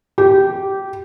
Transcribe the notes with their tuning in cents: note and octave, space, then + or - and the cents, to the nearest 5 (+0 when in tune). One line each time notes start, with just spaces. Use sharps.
G4 -15